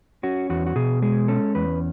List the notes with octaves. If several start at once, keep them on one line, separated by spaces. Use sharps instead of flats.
C#4 F#4
E2 F#4
F#4
B2 G#4
G#3 G#4
C#4 A4
E2 B4